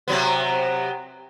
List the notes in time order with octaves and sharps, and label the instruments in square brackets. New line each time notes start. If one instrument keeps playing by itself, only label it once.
[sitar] C3 F#3 B3